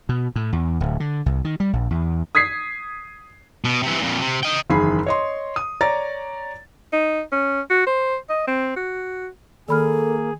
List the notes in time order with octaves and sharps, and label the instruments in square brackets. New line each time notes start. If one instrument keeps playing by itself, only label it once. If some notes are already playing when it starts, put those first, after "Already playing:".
[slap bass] B2
A2
E2
D1
D3
C2
D#3
G3
A#1
E2
[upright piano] D#6 G#6 B6 C7
[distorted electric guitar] B2
C3 E3
F2 A#2
C3
D#5 G5
[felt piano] F#1 E2 D#3 G#4 B5 C7
C#5 D#5 C6
D#6
C#5 D5 A#5 A6
[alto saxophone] D#4
C#4
F#4
C5
D#5
C4
F#4
[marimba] D#3 B5 F6 [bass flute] A#3 [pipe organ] G#4 [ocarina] A4